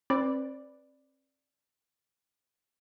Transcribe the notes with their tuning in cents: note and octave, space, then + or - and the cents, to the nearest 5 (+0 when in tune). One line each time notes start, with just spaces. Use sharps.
C4 +35 B4 +0 D5 +0